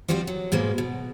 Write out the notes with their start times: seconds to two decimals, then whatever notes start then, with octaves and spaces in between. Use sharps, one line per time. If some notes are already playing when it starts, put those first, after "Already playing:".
0.08 F3 G3 C4 F4 F#4
0.27 F#3
0.52 G#2 B2 G#3 A#3
0.78 B2